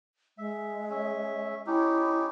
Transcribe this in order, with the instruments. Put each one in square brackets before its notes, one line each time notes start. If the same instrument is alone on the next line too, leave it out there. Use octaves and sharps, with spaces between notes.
[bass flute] G#3 [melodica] E5
[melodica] C#4 E5
[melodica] C#4 D#4 G4 [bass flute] E4